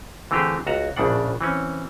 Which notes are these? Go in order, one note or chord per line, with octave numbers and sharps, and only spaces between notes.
D3 E3 A3 C4 G4 G#4
C#2 F#4 A#5
A#1 A2 C#3 D4 F#5
E3 C4 C#4